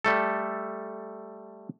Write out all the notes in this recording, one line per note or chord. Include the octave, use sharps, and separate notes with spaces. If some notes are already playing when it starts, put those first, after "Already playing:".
G3 A3 A4